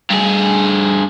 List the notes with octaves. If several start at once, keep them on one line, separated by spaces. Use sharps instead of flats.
G2 G#4